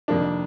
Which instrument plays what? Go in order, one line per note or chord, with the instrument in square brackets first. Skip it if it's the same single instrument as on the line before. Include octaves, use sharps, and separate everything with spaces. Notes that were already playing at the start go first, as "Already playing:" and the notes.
[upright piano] F2 C3 D#3 A#3 D4